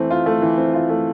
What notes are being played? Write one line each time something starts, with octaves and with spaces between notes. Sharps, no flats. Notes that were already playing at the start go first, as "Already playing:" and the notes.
Already playing: E3 A3 C4
F4
A3
E3
C4
F4
A3